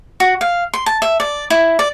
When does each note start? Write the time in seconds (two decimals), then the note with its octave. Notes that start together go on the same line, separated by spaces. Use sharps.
0.20 F#4
0.41 F5
0.74 C6
0.86 A5
1.02 E5
1.20 D5
1.50 E4
1.79 D5